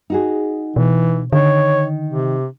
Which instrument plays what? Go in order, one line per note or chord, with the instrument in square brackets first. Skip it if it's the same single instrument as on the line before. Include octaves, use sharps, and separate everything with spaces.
[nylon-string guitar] D#4 F#4 G#4
[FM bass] B2 [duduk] E3
[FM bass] D3 [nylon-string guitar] D#3 [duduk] C#5
[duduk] C3